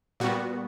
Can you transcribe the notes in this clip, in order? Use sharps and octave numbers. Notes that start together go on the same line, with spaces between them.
A#2 G3 B3 F#4